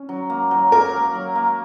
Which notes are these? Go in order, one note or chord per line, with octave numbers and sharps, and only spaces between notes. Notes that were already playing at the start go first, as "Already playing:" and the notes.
Already playing: C#4
F#3
A#3
F#3
A#3 A#4
A#3
F#3
A#3